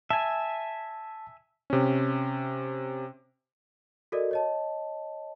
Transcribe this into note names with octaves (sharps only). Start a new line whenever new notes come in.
E5 G#5 A5
C3 C#4
F#4 A4 A#4 D5 D#5
C#5 D#5 A5